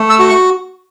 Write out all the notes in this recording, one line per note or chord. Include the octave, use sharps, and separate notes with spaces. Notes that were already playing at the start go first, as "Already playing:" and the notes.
Already playing: A3
E6
F#4
C#6